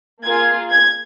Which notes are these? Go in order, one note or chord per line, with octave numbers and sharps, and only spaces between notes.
A#3 F4 G#4 G#6
G#6